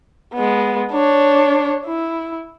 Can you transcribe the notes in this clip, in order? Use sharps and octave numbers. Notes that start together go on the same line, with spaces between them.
G#3 B3
D4 C#5
E4